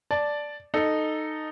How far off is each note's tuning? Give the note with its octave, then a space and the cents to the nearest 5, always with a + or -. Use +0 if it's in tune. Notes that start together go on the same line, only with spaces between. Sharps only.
D5 +0 A5 -5
D#4 -10 A4 +0